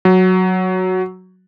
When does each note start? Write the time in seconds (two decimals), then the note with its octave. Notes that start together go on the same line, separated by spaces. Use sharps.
0.05 F#3